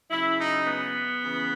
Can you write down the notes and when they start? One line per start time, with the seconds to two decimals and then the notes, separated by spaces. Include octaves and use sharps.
0.10 C#3 F#3 E4
0.38 D#4
0.67 B3
1.23 C#3 E3